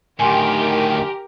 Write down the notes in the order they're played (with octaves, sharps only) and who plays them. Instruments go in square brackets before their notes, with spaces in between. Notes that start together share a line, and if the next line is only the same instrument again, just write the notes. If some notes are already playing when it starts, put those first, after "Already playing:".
[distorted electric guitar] D2 A2 [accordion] D#3 [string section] G4 A#4 [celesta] G#5 C6